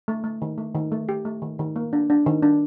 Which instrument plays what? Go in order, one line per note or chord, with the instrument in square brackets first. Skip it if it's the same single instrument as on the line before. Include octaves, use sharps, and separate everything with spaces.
[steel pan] A3
A3
D#3
A3
D#3
A3
G4
A3
D#3
D#3
A#3
D4
D4
D#3
D4